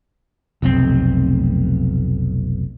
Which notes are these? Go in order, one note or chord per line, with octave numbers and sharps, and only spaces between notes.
F1 B1 C4